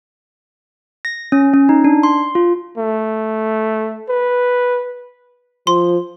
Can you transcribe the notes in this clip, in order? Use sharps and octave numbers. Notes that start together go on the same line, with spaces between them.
A#6
C#4
C#4
D#4
D4
C6
F4
A3
B4
F3 C6